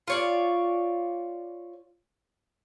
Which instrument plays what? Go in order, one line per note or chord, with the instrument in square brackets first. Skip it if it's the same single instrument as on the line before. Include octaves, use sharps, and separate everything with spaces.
[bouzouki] F4 C#5 D5